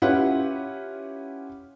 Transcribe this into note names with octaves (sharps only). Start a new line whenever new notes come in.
C#4 E4 F4 G4 B4 F#5